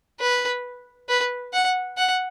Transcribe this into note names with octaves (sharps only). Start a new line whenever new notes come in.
B4
B4
F#5
F#5